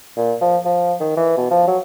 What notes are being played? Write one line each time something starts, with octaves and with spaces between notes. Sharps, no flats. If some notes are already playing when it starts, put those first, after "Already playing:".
A#2
F3
F3
D#3
E3
B2
F3
F#3